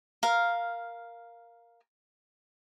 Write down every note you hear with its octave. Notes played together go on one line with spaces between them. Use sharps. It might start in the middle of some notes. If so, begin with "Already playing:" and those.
A#4 F5